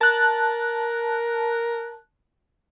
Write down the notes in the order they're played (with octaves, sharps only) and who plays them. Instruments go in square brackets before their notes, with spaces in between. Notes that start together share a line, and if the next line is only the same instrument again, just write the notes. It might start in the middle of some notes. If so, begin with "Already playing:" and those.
[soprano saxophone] A#4 [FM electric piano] A5 F#6